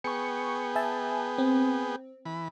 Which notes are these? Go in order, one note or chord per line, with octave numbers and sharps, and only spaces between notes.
B3 G#4 G5 C#6 C#7
E5 G#5 A5
C4
E3 B5